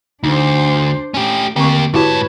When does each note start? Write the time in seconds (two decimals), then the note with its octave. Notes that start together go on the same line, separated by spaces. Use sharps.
0.23 D2 D4 D#4 C5
1.14 A3 C#4 G4
1.56 D3 A#3 C4 G4 C#6
1.94 G#2 E4 F#4 G4 B4 C#5 A5